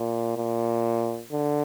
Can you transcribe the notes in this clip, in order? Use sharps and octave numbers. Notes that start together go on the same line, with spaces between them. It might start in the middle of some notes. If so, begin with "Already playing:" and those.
Already playing: A#2
A#2
D3